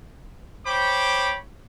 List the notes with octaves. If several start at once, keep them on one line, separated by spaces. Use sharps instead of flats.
C5 C#5 G5 B5 D6